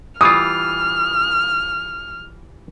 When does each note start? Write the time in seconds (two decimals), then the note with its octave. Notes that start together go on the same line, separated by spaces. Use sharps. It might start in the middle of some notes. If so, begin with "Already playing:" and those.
0.21 E3 G3 F4 D#6 F6